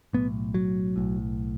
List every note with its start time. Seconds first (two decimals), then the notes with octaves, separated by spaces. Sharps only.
0.13 B1 A2 B3
0.54 F#3
0.96 B1 A2